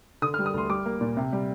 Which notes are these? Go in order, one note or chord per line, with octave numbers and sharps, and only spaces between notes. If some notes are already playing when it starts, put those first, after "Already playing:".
D3 D#6
F6
G3
D#6
D2 C6
G3 D6
A#3
A#2
C3
G3